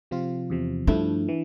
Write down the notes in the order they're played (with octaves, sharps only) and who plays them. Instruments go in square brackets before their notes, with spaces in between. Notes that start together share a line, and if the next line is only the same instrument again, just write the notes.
[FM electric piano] C3 F3 C4 F4
E2 C3 F3
[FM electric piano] G2 F3 A3 E4 [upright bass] D4
[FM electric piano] E3